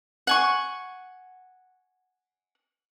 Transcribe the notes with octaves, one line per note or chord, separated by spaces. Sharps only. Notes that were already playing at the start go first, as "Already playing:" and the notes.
F#5 G#5 C#6